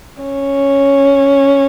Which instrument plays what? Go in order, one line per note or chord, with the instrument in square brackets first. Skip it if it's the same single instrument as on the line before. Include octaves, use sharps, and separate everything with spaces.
[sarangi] C#4